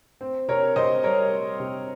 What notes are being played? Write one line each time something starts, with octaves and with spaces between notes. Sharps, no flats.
C4
C3 A#4 C#5
C3 C5 D#5
G3 A#4 C#5
C4
C3